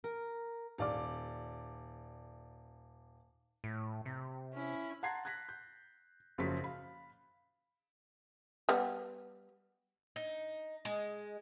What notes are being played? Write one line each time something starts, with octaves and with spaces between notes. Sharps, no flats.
A#4
D#1 D5 D6
A2
C3
C#4 E4
F#5 A5 A#5 C6 G#6 C7
F#6 G#6 A#6 B6
G6
F#1 C#3 F3 F#3 F#4 B6
F5 B5
G3 B3
D#4
G#3